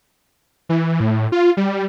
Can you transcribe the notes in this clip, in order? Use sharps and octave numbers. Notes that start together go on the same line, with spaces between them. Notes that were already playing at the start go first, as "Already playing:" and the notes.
E3
A2
F4
G3